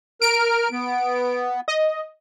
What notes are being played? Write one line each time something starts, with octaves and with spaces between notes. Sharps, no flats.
A#4 F6 D7
B3
D#5